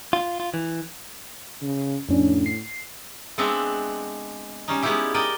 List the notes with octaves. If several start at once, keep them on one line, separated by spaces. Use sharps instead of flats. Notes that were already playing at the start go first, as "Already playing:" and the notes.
F4
F4
E3
C#3
F2 A2 C#4 D4
C7
G#3 B3 C4 D4 E5 F#5
G3 C#4 D#4
G#3 B3 C#4 D#4 E4 G4
A#4 D5 D#5 G5